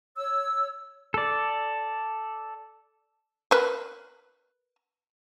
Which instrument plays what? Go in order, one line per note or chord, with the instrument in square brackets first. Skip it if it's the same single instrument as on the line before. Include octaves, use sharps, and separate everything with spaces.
[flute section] C#5 E6
[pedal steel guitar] A4 D5
[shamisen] A#4 B4